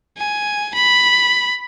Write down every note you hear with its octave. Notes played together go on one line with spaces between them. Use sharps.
G#5
B5